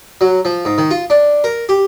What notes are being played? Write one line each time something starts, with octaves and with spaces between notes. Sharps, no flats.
F#3
F3
G#2
D#3
F4
D4
A#4
G4